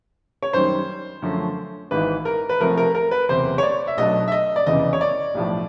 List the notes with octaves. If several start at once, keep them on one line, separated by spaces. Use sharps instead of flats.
C#5
F#2 D#3 G3 C5
F#2 D3 F3 A3 C#4
G#1 G#2 E3 B4
A#4
B4
C2 C3 F3 A3 A#4
A#4
A#4
B4
F#1 E2 C3 C5
C#5
D5
E5
B1 B2 F#3 A3 D4 D#5
E5
D#5
D5
F1 E2 C#3 E3 D#5
C#5
D5
B1 A2 F3